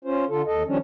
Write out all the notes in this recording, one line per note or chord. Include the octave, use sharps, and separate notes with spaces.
C#4 F4 C5
D3 F4 A4
D#2 A4 D#5
D#3 F3 G3 C#4 D4